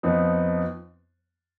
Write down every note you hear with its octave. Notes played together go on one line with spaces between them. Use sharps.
F2 F3 B3 D#4